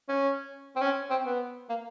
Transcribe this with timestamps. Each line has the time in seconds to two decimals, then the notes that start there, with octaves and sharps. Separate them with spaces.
0.09 C#4
0.76 C4
0.81 C#4
1.10 C4
1.26 B3
1.69 A#3